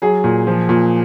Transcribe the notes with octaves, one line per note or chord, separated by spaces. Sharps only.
F#3 G#4
A#2
F3
A#2